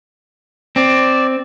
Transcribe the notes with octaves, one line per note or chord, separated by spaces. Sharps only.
C4 D5